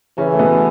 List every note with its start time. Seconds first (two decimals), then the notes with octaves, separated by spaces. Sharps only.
0.18 C#3 E3 C#4
0.34 A3
0.39 B2 B3